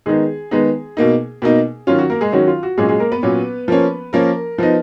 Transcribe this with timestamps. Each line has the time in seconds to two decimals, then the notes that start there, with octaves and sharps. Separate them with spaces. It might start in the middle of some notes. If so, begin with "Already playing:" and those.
0.06 D#3 G#3 B3 D#4 G#4
0.51 D#3 G#3 B3 D#4
0.97 B2 A#3 D#4
1.42 B2 A#3 D#4
1.87 D#3 F#3 C#4 F4
1.99 F#4
2.10 A#3 A#4
2.21 G#3 G#4
2.32 D#3 F#3 C#4 F#4
2.47 F4
2.63 F#4
2.78 A#2 F#3 G#3 C#4 G#4
2.88 G#3 G#4
3.00 A#3 A#4
3.12 B3 B4
3.23 A#2 F#3 C#4
3.68 F3 A#3 C#4
4.13 F3 A#3 C#4 A#4
4.58 F3 B3 D#4